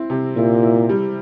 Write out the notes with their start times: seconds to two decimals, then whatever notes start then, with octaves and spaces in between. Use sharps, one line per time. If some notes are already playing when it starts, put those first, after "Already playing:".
Already playing: C4 E4
0.10 C3
0.36 A#2 E4
0.63 E4
0.89 G3